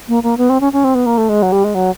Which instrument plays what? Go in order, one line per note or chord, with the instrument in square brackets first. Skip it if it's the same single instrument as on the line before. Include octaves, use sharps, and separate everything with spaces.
[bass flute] A#3
A#3
B3
C4
C#4
C#4
C4
B3
A#3
A3
G#3
F#3
G3
G#3
F#3